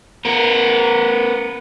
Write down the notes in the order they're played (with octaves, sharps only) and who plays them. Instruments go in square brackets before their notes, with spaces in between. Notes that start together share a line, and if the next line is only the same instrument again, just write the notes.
[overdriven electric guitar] B3 A#4